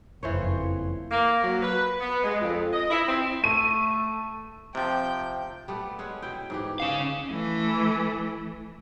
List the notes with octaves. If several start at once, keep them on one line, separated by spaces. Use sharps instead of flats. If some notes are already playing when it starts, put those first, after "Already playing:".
F#1 F2 E3 F3 C5 C#5
A#3
F#3
B4
B3
G#3
F2
D#5
E4
C4
A3 D#7
C3 F3 G5
G3 A3 B3
G#3 C#4 F#5
B2 E4 G5
G#2 E3 G4
C#4 F5
E3 A3